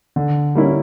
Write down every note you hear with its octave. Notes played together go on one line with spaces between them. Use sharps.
D3
G3 A#3 C#4 E4